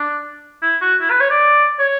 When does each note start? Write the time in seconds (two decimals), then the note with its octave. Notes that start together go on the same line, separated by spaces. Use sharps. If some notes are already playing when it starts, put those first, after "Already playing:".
Already playing: D4
0.62 E4
0.81 F#4
1.01 E4
1.11 B4
1.20 C#5
1.31 D5
1.79 C#5